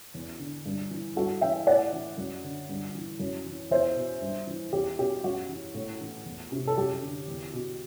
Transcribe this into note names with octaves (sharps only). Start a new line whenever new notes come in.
E2
D3
G2
E3
G2 F#4 A4
E3 E5 G5
A2 D5 F#5
E3
F#2
D3
G2
E3
F#2
E3
E2 C5 E5
B2
G2
E3
E2 G4
B2 G4
F#2 F#4
E3
A2
E3
E2
C3
A4
F#2 G4
D3
E2
B2